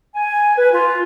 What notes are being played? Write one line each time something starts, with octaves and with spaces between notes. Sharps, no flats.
G#5
B4
F4